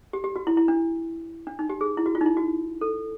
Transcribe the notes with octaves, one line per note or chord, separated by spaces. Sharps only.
G4
G4
F#4
E4
E4
D4
D4
D#4
G4
G#4
E4
F#4
F4
D#4
E4
F#4
A4